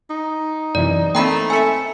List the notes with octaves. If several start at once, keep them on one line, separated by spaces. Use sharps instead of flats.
D#4
F#2 C3 E3 D5
A3 A#3 C4 G5 A#5 B5
C4 A4 E5 G#5 C#7